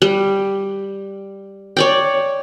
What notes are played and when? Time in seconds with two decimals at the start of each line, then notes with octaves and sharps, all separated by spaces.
0.02 G3
1.77 C#5 D5 G5